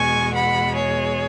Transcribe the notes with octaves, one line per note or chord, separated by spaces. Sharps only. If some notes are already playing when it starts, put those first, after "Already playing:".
Already playing: E2 B2 G#3 G#5 C#6
F#5 B5
G#4 C#5